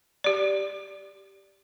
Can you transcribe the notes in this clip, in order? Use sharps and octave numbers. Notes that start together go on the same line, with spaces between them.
G4 D5